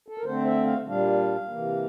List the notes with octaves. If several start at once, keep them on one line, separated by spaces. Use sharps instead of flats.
A4
A#4
D3 A3 C4 C5
E5
F5
A#2 G3 D4 F5
C3 E3 A#3